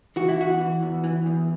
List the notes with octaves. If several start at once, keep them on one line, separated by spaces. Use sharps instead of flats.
E3 F#4
E4
E2 F#4
E3
E2
E3
E2